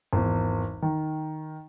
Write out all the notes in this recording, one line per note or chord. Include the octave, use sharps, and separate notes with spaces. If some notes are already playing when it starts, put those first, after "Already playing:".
G#1 E2
D#3